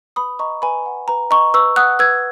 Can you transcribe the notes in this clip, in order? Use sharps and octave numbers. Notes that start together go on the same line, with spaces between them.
B4 B5 D#6
D#5 A#5 C#6
B4 G#5 B5
F#5
B4 A#5
D#5 A#5 C#6
B4 C#6 E6
F#5 D#6 F#6
B4 E6 G#6